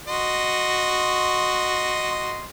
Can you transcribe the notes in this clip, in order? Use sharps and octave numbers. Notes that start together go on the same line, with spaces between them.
F#4 D#5 C6